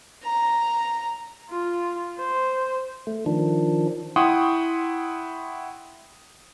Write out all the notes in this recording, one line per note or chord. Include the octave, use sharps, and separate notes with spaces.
A#5
F4
C5
A3
D#3 F3 D4
E4 F#5 G5 C6 C#6 D#6